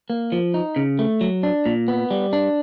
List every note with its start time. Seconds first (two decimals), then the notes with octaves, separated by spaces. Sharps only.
0.10 A#3
0.32 F3
0.54 D#4
0.76 C#3
0.99 A3
1.21 F#3
1.43 D4
1.66 A#2
1.88 B3
2.11 G3
2.33 D4